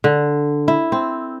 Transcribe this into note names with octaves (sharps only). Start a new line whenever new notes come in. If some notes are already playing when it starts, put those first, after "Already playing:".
D3
E4
C4